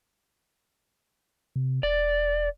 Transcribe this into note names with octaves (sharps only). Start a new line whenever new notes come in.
C3
E1 D5